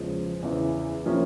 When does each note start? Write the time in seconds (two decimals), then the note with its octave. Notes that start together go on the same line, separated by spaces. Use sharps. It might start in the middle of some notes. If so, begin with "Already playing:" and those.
Already playing: E2 C#3 F3 G#3
0.43 E2 C#3 E3
1.06 C3 F3 A#3 C#4 E4